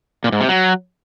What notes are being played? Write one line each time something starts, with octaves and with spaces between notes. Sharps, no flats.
A#2
G#2
C3
F#3